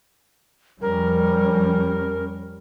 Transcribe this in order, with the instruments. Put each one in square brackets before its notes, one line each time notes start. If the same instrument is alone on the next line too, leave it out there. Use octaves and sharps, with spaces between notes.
[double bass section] F2 G3 C#4 [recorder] A#4